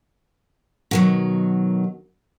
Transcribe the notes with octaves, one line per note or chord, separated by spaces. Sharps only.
B2 D#3 F#3